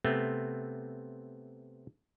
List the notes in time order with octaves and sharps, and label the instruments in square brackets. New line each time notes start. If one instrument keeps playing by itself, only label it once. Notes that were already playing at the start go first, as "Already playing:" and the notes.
[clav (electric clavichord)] C3 A3 B3 C4